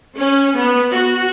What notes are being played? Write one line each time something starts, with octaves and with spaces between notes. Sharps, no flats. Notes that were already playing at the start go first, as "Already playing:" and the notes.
C#4
B3
F#4